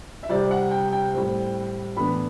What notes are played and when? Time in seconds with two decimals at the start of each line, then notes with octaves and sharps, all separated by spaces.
0.23 E5
0.29 C2 C3 G3 C4 D5
0.51 F#5
0.71 G5
0.92 G5
1.13 A2 G3 C4
1.97 A2 E3 B3 D4 B5